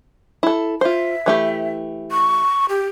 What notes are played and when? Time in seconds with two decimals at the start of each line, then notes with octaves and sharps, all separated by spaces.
0.43 E4 A4
0.81 F4 C5 E5
1.26 E3 A3 G4
2.11 C#6
2.69 G4